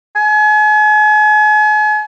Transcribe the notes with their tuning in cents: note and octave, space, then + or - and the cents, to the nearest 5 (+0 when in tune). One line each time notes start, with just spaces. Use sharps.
G#5 +40